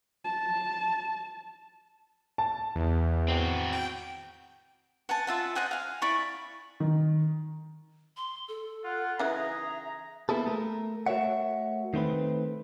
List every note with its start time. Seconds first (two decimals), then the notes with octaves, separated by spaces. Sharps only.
0.25 A5
2.38 A5
2.76 E2
3.28 C4 F#4
3.73 G5
5.09 F#5 G#5 A5
5.27 F4 E5 F#5
5.55 C5 D#5 F#5 G#5
5.71 F5 G#5
6.02 E4 D5 B5 C#6
6.80 D#3
8.17 C6
8.48 A4
8.84 F4 F#5
9.19 C#3 E3 D#4 G#4 E5 F#5 A#5
10.29 A#3 B3 E4 G#4 A4
10.46 A3 A#4
11.06 A3 F#4 A#4 C#5 E5 F#5
11.94 D#3 A3 C4 B4